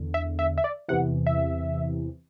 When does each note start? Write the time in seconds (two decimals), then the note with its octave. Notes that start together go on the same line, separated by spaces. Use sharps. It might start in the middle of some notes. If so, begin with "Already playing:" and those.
Already playing: E2 D3
0.14 E5
0.39 E5
0.58 E5
0.64 D5
0.88 E2 C3 E3 F#5
1.27 E5